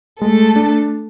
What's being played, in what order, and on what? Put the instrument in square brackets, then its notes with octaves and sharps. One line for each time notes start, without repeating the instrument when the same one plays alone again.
[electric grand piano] G#3 [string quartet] A3 A4
[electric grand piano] D4